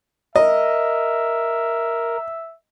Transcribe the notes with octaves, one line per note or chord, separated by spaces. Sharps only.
A#4 D#5 E5